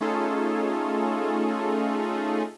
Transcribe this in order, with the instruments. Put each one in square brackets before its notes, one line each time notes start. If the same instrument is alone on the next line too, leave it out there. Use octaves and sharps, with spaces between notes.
[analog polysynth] A3 C#4 D#4 F4 G#4 A4